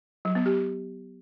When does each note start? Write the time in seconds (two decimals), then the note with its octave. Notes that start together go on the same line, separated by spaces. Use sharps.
0.25 F#3
0.35 B3
0.46 G4